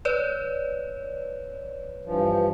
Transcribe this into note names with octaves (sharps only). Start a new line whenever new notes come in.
B4 C#5 D5
G2 E3 F3